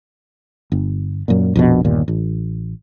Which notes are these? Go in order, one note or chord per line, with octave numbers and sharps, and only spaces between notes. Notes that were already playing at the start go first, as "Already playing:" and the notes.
G1
F#2 A#2
A#1 F2 B2
G1 D#2 A#2
A1